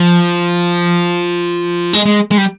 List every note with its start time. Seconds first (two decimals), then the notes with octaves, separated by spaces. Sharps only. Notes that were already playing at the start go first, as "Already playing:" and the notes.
Already playing: F3
1.93 G#3
2.06 G#3
2.31 G#3
2.38 G3